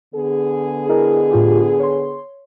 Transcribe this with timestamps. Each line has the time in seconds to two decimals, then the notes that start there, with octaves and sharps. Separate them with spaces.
0.15 D3 B3 G#4
0.89 E4 A#4 D#5
1.30 A2 F4 G4
1.79 C#5 C6